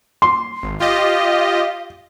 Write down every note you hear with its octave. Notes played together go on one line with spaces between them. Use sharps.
C6
G#1
F4 G4 D#5 F5